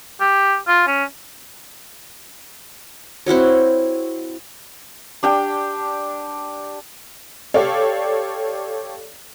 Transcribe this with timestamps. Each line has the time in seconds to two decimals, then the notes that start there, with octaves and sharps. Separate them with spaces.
0.20 G4
0.68 F4
0.88 C#4
3.26 C4 E4 F#4 C#5
5.23 D4 G4 G5
7.54 G4 A4 C#5 D5 F5